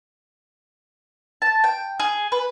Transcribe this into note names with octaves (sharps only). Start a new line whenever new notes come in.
A5
G5
G#4
B4